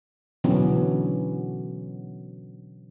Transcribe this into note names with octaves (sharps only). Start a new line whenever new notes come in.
B2 D3 E3 F#3 B3 C#4